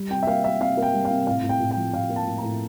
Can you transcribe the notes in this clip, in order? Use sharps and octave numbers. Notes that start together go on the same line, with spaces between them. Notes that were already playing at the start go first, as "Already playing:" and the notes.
Already playing: G3
C3 G5
E5
A#3 F5
A#3 E5
C3 F5
A#3
G5
G3
F5
C3
A2 F5
A2
G5
A2
G5
F3
A2 F5
A#3
A5
A2
A#5
A2